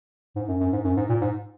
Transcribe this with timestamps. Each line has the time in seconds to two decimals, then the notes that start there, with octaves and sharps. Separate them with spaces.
0.36 G#2
0.48 F#2
0.60 F#2
0.73 G#2
0.84 F#2
0.97 G#2
1.09 A#2
1.21 G#2